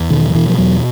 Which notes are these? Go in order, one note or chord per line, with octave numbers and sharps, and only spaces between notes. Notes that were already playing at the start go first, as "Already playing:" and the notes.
Already playing: E2
B2 D#3
F3
B2 E3
F3
E2 F#3